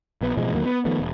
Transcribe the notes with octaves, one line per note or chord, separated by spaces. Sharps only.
A#1 B3
A1 B2 F3 G#3
D#2 D3 F#3 A#3
B3
D#3 F3 A3 B3
E1